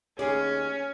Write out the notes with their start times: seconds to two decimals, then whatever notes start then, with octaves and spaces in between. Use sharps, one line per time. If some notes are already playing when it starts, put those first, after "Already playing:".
0.19 D#2 C#4 G#4 D5